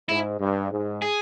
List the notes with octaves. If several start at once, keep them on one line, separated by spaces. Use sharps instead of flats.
G#2 E4
G2
G#2
G#4